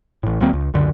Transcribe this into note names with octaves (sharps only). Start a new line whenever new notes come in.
A1 A2
D2 F#3 A#3 C4
C#2
C#2 F#2 D3